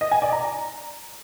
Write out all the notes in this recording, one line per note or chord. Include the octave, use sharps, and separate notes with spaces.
D#5
G#5
D5
A#5